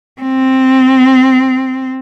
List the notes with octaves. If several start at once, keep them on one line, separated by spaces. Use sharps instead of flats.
C4